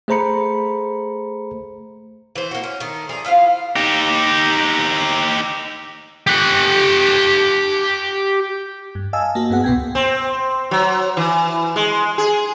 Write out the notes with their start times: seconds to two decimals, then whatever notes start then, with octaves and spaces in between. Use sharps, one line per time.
0.08 A3 G#4 C5 A#5 B5 C#7
2.35 E3 C5
2.51 A#3 F#4
2.64 C#4
2.80 D#3 A3
3.09 F3 G#4 D5 A#5
3.25 E4 F4 C5 F5
3.76 D#4 G4
6.27 G4 F#5
8.95 G2
9.13 D#5 F5 G#5 A5 E6
9.35 A#3 F#4
9.50 G2 B3 G#4 F#5
9.64 C#2 B2 B3 G5 G#6
9.95 C4
10.71 F#3
11.17 E3
11.76 G#3
12.18 G#4